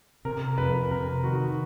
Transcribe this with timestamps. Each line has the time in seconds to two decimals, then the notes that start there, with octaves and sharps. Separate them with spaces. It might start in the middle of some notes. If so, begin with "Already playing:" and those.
0.25 C3 A#4
0.58 F2 B4
0.91 C3 A#4
1.23 D#3 F#4